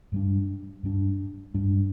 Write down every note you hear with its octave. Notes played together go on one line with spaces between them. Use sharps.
G2 G3 D4
G2 G3 D4
G2 G3 D4